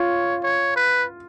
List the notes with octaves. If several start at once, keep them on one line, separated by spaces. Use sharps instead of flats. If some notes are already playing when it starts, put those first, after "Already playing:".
Already playing: F4 C#5
C#5
B4